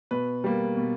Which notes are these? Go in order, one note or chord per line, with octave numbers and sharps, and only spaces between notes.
B2 B4
G3 A#3
B2